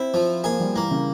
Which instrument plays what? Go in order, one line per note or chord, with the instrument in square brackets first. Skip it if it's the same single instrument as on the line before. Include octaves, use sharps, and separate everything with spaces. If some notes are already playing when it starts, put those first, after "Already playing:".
Already playing: [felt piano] C4 [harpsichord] E4
[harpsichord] F3
[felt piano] A#3 [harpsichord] G#4
[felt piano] G3
[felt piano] E3 [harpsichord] A#3
[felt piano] C#3